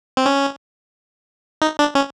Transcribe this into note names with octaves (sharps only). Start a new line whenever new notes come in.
C4
C#4
D#4
D4
C#4